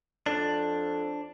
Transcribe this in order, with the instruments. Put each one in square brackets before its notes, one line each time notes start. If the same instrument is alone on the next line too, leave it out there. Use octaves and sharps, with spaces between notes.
[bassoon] F2 [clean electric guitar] D4